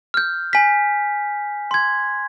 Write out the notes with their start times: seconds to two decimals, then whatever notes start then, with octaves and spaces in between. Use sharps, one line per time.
0.14 F6 G6
0.53 G#5 B6
1.71 C6 G#6